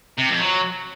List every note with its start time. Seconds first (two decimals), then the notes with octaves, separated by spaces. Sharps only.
0.18 C3
0.29 F2
0.40 F#3